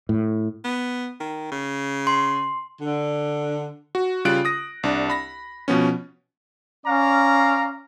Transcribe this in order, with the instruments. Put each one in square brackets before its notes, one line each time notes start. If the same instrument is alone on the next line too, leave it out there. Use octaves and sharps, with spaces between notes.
[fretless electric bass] A2
[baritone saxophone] B3
D#3
C#3
[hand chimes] C6
[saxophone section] D3
[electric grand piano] F#4
C#3 G3 F4 F#6 D7
D#6 A#6
C2 D4
B5 A#6
B2 F3 B3 C#4
[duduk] C#4 [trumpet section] D5 F5 A#5